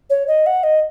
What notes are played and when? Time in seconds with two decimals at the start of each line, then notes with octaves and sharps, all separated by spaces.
0.10 C#5
0.27 D#5
0.46 F#5
0.63 D#5